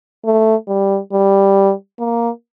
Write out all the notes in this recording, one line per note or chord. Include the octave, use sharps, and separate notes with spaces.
A3
G3
G3
A#3